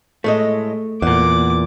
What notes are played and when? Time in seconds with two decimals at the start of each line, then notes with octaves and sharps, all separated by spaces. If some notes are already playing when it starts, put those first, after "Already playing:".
0.24 A2 G#3 A3 D#5
1.02 E2 A#2 F#5 D6